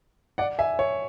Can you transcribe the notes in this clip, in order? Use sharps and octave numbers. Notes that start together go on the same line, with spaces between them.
D5 F#5
E5 G#5
C#5